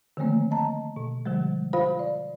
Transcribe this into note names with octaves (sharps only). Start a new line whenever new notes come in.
D3 D#3 F3 A3 A#3 C4
D#5 A5 A#5
B2
D3 F3 G3 G#3
F4 C5 F5 B5
D5